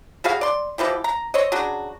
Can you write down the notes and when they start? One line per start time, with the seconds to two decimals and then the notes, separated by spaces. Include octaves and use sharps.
0.24 G3 F#4 G#4 F5
0.41 D5 C6
0.78 B2 E3 F3 G4
1.04 A#5
1.34 C4 C#5 D#5
1.52 C#3 F#3 D4 F#4